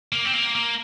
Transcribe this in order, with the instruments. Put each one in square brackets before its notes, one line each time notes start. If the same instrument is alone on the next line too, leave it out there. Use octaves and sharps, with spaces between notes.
[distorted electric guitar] A#3
C4
A#3
A#3